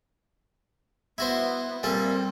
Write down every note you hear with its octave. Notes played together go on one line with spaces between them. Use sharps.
B3 E4 F#4 C5
A#2 G3 C4 A4